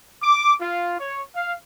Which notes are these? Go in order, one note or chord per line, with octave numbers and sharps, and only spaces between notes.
D6
F4
C#5
F5